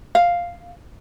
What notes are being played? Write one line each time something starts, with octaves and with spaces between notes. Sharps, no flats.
F5